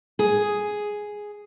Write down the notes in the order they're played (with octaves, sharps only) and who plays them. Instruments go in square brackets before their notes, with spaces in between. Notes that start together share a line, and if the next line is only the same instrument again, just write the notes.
[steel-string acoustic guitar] G#4